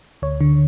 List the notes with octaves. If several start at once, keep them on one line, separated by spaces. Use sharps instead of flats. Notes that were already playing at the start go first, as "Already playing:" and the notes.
D2 C#5
D3